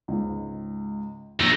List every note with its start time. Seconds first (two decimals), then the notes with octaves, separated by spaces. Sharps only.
0.08 C#2 G#2
1.40 A#1 A3 D#4